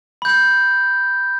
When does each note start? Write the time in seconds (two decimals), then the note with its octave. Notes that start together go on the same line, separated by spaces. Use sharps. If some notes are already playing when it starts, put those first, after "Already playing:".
0.22 B5 G6